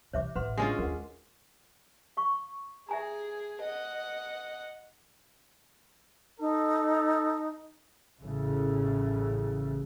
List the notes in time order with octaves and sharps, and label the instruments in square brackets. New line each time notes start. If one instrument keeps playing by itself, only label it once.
[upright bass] C3 E3 [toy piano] C#5 E5 D6
[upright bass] A1 [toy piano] B4 F#5 C6
[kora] G#3 C#4 F4 [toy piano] D4 F#4 D6
[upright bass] D#2 [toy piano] A#4 F#5
[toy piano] F5 C#6
[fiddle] G#4 [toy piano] E5 G#5 A#5
[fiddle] D#5 F#5
[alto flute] D#4 [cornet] A4
[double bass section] A1 C#3 E3 A3